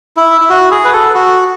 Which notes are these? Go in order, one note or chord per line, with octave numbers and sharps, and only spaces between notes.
E4
E4
F#4
G#4
B4
A4
F#4